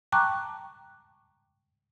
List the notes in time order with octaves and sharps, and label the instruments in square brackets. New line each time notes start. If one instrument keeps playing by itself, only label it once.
[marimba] G5 A5 A#5 C#6 D6 F#6